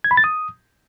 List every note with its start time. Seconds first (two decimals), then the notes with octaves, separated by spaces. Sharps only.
0.04 G#6
0.11 B5
0.17 A6
0.24 D#6